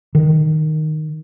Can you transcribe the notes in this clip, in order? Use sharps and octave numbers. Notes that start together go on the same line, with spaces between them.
D#3